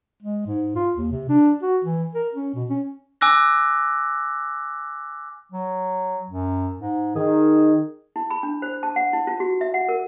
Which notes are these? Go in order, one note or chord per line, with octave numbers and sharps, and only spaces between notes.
G#3
G#2
F4
D#2
C3
D4
F#4
E3
A#4
C#4
B2
C#4
G#5 D6 E6 F#6 A#6
F#3
F#2
G#2
D#3 G#4
E4
B5
D4
C5
A5
F#5
E4
F4
F#4
E5
F#5
A#4